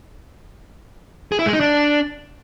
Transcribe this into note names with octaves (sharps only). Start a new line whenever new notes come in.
G#4
E4
G#3
D#4
D4